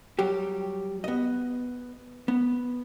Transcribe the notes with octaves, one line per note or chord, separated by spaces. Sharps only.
F#3 G3 G4
B3 D#5
B3